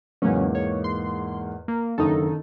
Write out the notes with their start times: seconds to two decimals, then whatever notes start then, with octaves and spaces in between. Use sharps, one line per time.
0.22 E2 G#2 C#3 F#3 A#3 C#4
0.55 C#5
0.84 C6
1.68 A#3
1.98 F#1 D3 D#3 D#4 A4